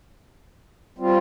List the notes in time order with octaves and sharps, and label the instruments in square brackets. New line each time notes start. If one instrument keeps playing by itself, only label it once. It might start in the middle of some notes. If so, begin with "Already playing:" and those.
[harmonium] G3 C4 F4